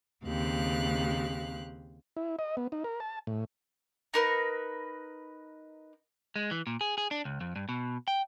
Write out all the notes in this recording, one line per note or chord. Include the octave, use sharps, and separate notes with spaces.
D#2 C#3 C4 G4 F5 F#6
E4
D#5
B3
D#4
A#4
A5
A2
D#4 A#4 B4
G#3
E3
A#2
G#4
G#4
D4
C#2
F2
G2
B2
G5